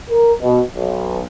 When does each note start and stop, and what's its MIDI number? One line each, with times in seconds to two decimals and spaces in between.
0.10 0.33 70
0.41 0.61 47
0.73 1.20 35